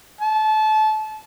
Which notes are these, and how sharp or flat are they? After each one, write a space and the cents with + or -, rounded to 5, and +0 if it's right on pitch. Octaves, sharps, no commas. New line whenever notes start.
A5 -25